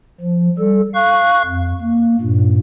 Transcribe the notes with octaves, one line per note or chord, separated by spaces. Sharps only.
F3
G3 A4
F5 C#6 F#6
F2
A#3
G2 A#2